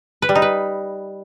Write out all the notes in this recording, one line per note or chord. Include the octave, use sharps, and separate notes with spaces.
B4
G3
D#4
B4